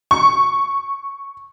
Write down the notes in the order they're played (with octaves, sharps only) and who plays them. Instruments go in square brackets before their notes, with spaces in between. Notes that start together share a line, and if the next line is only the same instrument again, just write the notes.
[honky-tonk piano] C#6